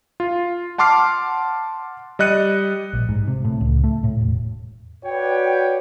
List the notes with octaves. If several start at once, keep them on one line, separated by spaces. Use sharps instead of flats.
F4
F#5 A5 C6 D6 F6 C7
G3 D#5 F#6 C#7 D#7
A#1
G#2
C3
A2
C#2
A3
A2
E1
F#4 B4 C#5 D5 G5